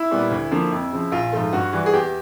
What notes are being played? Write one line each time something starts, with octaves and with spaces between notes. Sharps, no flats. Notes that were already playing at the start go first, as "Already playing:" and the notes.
Already playing: E4
A#2 G3 B3
D2
D3 F3 A#3
F2
C#3 F3
A#1 F4
G#2 F3 A3
G2 F#4
E3 G3
G#4
E2 G4